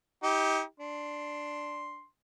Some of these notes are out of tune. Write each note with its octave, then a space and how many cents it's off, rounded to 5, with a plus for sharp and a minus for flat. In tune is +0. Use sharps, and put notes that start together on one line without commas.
D#4 +35 G4 +0
D4 +0 C6 +0